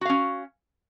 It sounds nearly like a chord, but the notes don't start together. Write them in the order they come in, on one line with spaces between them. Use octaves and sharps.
F#4 F5 C#4